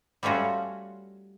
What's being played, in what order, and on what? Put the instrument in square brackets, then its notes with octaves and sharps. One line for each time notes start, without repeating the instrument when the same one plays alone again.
[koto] G3 A3 C#4 F4 F#4